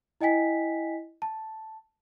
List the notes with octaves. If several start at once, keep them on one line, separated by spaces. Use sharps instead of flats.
E4 D#5 G5 G#5 B6
A5